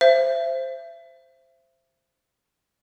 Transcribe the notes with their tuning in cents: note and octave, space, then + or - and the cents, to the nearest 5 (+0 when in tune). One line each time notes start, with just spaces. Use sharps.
C5 +0 E5 +30